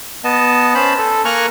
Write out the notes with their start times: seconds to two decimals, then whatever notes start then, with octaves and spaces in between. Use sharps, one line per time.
0.24 B3 D#5 A5
0.75 C#4 C5 A5 B5
0.99 A4
1.25 A#3 G#5 A#5 C#6 F6 F#6